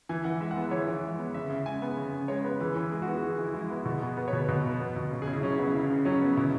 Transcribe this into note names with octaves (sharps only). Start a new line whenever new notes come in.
E3 G#5
E3 F#5
G#3 E5
F#5
B3
E5
E3 C#5
E3
G#3
B3
C#3 E5
C#3
G#3 G#5
B3
C#3
C#3
G#3 C#5
B3 B4
E3 B4
E3
G#3 G#4
F#4
B3
F#4
E3
E3
E4
G#3 E4
B3
B2 F#4
B3 G#4
B3 B4
C#5
B2
B4
B2
B3
B3
B2
C#3
G#4
C#3 E4
F#3 C#4
B3 E4
C#3 E4
C#3
F#3 C#4
B3
B2 E4